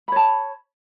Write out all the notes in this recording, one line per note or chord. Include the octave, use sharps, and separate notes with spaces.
C#5 A5 B5